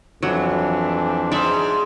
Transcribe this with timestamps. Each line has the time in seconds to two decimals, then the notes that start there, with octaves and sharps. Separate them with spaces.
0.23 F2 E3 F#3 D4
1.32 G#2 D5 E5